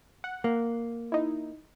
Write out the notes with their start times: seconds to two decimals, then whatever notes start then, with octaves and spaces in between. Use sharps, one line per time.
0.24 F#5
0.44 A#3
1.12 D#4 E4